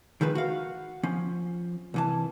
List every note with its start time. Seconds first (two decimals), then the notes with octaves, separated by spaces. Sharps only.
0.21 D#3 F3 G#3 B4
0.35 F#4 F5
1.03 F3 C#4
1.94 C2 E3 A5